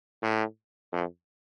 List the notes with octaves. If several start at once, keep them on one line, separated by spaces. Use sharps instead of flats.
A2
F2